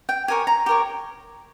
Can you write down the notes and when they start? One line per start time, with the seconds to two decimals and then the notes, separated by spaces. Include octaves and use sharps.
0.09 G5
0.28 G4 A#4 C#5 G#5
0.47 A#5
0.66 G4 A#4 C#5